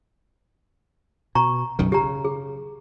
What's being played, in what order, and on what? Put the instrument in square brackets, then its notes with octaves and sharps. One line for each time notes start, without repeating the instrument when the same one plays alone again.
[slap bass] B2 [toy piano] A#5 C#6
[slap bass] B1 F#2 D#3
[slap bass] C#3 [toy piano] G4 A#5
[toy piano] G#4